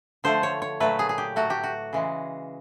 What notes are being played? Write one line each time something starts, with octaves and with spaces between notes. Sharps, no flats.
D3 F3 A3 C5
C#5
C#5
A#2 F#3 A3 B4
G#4
G#4
G4
A2 F#3 A3 F#4
G4
F#4
C#3 E3 G#3